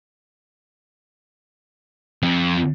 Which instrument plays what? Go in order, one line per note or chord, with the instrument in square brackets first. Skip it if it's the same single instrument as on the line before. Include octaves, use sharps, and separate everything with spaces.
[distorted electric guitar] F2